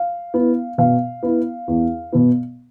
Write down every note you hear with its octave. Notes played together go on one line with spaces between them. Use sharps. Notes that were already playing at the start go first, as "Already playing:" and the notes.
Already playing: F5
B3 E4
B2 F5
B3 E4
E2
B2 B3